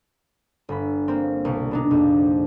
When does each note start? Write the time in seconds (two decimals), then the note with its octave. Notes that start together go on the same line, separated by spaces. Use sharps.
0.69 G1 B5
1.08 A#3 C4
1.45 C2 B2
1.71 B3 D4 D#4
1.91 A#1 F2